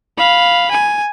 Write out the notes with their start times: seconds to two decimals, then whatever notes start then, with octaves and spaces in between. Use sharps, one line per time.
0.18 F5 B5
0.71 G#5